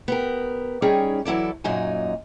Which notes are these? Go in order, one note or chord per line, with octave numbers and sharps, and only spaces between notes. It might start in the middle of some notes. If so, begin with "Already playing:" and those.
B3 G4 A#4
G3 C#4 D#4 G#4 C#5 G5
E3 F#3 E4 A4 D5
F#2 A#2 F#3 D#4 G#5